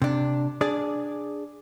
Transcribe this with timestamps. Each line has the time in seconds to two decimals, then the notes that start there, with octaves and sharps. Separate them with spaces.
0.02 C3 D4
0.61 D4 G#4 D5